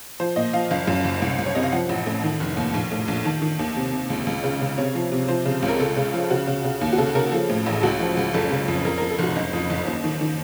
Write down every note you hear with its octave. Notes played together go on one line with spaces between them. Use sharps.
F3 C5
A#2 D#5
F3 F5
F#1 F5
F#2
F#1
C2
C2
C#5
C3 D#5
F5
F3 F#5
A1
A2
D#3
F1
D#2
A#1
A2
A#1
D#3 A5
D#3
D#2
C3
C3
C#2
C#2
C#3
C#3
C3 C#5
F3
C3
F3 C5
C#3
C#2
A#4
C#3 A4
C#3
F3
C#3 F#4
C#3
C#3
D#2
F#4
C#3 A4
C#3 A#4
F3 A4
A2
A1
C#2 F#4
F3
C#2
F#1 A4
C#3
F2
F2 A#4
F2 A#4
A4
F1 F#4
F#1 D#5
F2
F#1
D#2
D#3
D#3